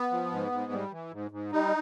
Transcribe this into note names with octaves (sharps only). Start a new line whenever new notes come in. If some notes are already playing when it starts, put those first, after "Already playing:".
Already playing: B3
F3
G#2
G#2
G3
E3
G#2
G#2
G3 D#4